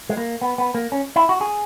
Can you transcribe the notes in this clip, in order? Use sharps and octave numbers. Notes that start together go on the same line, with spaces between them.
G#3
A#3
B3
B3
A#3
C#4
E4
F#4
G#4